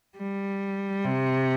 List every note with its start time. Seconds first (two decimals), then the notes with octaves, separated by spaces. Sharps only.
0.17 G3
1.04 C3